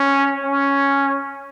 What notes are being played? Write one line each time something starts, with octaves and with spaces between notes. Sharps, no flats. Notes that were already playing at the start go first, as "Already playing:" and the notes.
Already playing: C#4
C#4